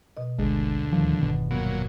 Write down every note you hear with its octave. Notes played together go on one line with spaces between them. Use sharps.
B2 D#5
G#1 D2 G#3 G#4
D#2 A2 D#3 F3 G3
G1 E2 B2
A#2 F#3 B3